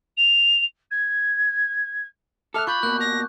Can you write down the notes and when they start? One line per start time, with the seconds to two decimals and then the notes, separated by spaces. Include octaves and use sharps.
0.17 F7
0.91 G#6
2.54 A4 E5 D6 F6 F#6
2.67 F4 B5 C#6 G6
2.83 B2 A#3 F#6
3.00 A#6